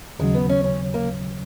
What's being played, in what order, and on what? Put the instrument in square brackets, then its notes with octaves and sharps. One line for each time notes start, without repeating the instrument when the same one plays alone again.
[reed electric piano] D#2 C#3 F#3 [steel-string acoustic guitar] G#3
[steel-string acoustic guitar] B3
C#4
C#4
A#3